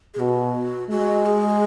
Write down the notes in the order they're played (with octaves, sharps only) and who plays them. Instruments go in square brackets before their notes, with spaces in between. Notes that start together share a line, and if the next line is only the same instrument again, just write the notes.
[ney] G#4
[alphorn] B2 [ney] F#4
[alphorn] G#3 [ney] F#4
[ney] G#4